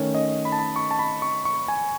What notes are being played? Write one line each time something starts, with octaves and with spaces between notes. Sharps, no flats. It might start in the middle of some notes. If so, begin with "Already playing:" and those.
Already playing: D#3 A3 C#4 C#5
D#5
B5
A5
B5
C#6
A5
B5
C#6
C#6
G#5